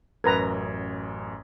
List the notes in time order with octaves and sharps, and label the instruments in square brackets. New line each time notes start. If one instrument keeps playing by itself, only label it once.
[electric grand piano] A1 F#2 G#6 [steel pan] A#4 B4 A#5